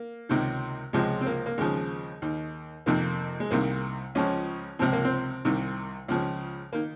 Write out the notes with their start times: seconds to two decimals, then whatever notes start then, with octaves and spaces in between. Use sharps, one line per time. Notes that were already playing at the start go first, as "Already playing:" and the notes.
Already playing: A#3
0.29 C#2 C3 D#3
0.93 C#2 C3 F3 G#3
1.21 C4
1.27 A#3
1.46 A#3
1.58 D#2 C#3 F3 G#3
2.22 D#2 D#3
2.86 F2 C3 D#3 A#3
3.40 G#3
3.51 C2 C3 D#3 A#3
4.15 C#2 C#3 F3 C#4
4.79 C#2 C3 F3 C4
4.93 A#3
5.05 C4
5.45 C2 C3 D#3
6.08 C#2 C#3 F3
6.73 D#3 A#3